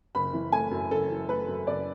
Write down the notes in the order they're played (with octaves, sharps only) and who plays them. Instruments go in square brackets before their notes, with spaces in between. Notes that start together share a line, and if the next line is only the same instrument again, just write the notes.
[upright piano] F#1 B5
E3
A3 G#5
F#2
F#1 A4
E3
A3 B4
F#2
F#1 D5